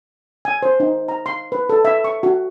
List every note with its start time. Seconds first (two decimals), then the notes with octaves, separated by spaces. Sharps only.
0.45 G#5
0.63 C5
0.80 D#4
1.09 A#5
1.26 C6
1.52 B4
1.69 A4
1.85 E5
2.04 C#6
2.23 F#4